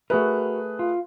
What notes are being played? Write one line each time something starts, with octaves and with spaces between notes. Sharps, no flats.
A3 F#4 G#4 A#4 B4
F4